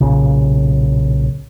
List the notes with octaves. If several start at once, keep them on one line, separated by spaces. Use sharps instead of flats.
B1 A#2 C#3